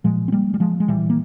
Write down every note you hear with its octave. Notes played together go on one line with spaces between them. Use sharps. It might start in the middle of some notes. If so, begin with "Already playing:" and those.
A#1 A#2 F3 G#3
C4
G3 A#3
G3
F3 G#3
G#3
A#1 A#2 E3 G3
A#3